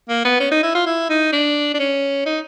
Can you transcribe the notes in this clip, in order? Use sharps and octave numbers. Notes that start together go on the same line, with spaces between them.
A#3
B3
C#4
D#4
E4
F4
E4
D#4
D4
D4
C#4
D#4